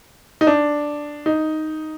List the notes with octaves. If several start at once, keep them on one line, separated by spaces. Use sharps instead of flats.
D#4
D4
D#4